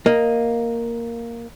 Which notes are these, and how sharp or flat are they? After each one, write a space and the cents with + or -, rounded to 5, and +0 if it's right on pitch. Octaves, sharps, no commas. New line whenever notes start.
A#3 +0 D#5 +0